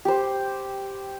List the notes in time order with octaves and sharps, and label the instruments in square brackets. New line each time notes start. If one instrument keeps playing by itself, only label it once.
[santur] G4 C5